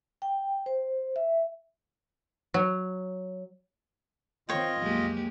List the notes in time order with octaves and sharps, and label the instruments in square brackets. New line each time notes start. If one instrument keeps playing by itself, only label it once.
[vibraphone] G5
C5
E5
[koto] F#3
[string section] D#3 C4 [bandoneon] F4 D#5 [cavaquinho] C#5 G5
[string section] B1 F2 [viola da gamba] G#3 A#3 G4